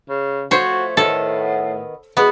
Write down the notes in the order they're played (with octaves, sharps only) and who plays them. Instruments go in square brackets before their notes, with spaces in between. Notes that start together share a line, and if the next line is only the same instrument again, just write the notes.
[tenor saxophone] C#3
[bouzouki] F3 A3 [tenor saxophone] F#4 [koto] C5 C#5
[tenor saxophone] A2 [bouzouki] D#3 B3 [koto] A4
[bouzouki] G#3 E4 F#4 [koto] B3